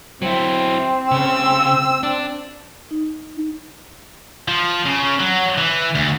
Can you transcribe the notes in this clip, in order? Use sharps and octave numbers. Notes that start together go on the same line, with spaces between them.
F#3 C4 E4
C#3 E6
D4
D#4
F3
C#3
F#3
E3
D2